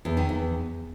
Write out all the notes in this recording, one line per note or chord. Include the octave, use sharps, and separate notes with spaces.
E2
D#3
E2